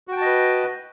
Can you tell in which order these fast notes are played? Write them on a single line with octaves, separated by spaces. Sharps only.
F#4 G5 A5 D#5 B4